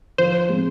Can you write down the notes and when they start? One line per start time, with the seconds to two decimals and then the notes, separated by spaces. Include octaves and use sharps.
0.18 F3 C5
0.49 G#3 C4